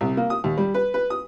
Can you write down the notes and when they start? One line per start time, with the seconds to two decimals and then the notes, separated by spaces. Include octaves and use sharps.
0.01 C2
0.17 A#3
0.30 D#6
0.44 D#2
0.58 G3
0.74 B4
0.94 B4
1.10 D#6